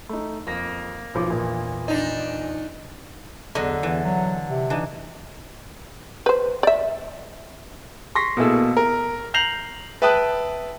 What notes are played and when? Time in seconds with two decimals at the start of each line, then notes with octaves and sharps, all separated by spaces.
0.09 A3 D#4
0.47 F2 A#3 A#6
1.14 B1 F3 D6
1.30 A#1 E2 A#2
1.88 D4 D#4
3.55 E2 D3 F#3 D#5
3.83 E2 E3
4.04 F#3
4.48 C3
4.70 E3 D4 D#4
6.26 B4 C5
6.63 D5 E5
8.15 C6 C#6 A#6 B6
8.37 B2 A#3 E4 G#4 A4 E6
8.77 A#4
9.34 A#5 G6 A#6 C7 F7 F#7
10.02 B4 E5 G5 A5 D#6 F#6